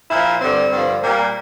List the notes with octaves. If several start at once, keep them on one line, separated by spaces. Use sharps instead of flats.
A#2 F3 E4
G2 D3 G3 C4
G2 D3 F3
A#2 G3 A#3